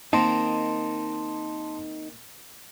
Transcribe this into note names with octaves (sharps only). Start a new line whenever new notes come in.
D#3 A#3 C4 D#4 A5 C6